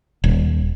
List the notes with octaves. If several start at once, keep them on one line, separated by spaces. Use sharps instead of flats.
D#1